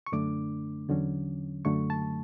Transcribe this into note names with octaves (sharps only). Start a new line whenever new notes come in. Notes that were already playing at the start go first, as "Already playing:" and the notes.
C#6
F#2 D3 A3 D4 D6
E2 D3 F#3 C#4
F#2 D3 F#3 A3 C#6
A5